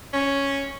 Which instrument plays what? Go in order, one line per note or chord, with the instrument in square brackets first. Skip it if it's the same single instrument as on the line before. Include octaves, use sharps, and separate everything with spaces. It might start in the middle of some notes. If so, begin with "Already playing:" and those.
[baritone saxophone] C#4